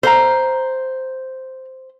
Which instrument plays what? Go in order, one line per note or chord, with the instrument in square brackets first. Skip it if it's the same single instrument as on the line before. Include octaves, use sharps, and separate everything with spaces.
[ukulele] A4 F5 A#5 [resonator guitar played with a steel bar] C5